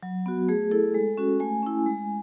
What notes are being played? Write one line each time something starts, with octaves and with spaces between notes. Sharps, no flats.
F#3
B3 F#4
A3 G#4
E4 A4
G#3
C#4 F#4
A3 G#5
C#4 E4
G#3